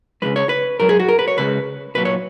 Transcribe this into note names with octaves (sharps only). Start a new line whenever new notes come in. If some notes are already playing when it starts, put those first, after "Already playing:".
C#2 C#3 E3 G#3 B4
C#5
B4
G#2 F#3 A#4
G#4
F#4
A#4
B4
C#5
C#2 C#3 G#3 B4
B1 A#2 F#3 B4
C#5